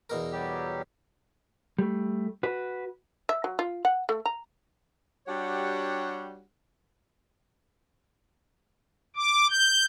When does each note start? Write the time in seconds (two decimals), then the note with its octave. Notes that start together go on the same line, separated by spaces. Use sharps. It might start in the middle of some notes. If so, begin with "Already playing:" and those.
0.10 E2 B2 A#4
0.32 F#3 G3 G4
1.79 G3 A3
2.43 F#4 B4
3.29 E5
3.44 F#3
3.59 F4
3.85 F#5
4.09 A3
4.26 A#5
5.27 G3 D4 F#4 G4 C#5 F#5
9.16 D6
9.50 G6